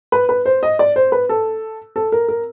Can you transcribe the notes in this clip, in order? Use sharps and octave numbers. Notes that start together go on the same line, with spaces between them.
B4
B4
C5
D#5
D5
C5
B4
A4
A4
A#4
A#4